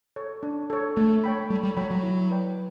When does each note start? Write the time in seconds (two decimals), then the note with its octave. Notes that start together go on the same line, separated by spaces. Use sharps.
0.16 A4 C#5
0.43 D4
0.70 A4 C#5
0.97 A3 A4
1.24 C#5 G5 B5
1.50 G3 A4
1.63 G3
1.77 F#3 C#5 G5 B5
1.91 F#3
2.03 E4
2.31 B4 D5 G5